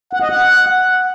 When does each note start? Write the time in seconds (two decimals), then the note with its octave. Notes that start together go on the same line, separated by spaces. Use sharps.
0.13 F#5
0.22 D#5
0.30 F#5